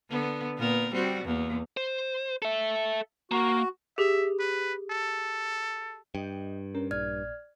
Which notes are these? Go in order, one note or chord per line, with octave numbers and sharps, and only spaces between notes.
D3 B3
A#2 B3 A#4
G3 C4 F#4
E2 A#3
C5
A4 E5
A#3 F#4
G4 G#4 E5
B4
A4
G2 D#5 G5
C#4 A#4
A#1 A#2 D5 F6 G#6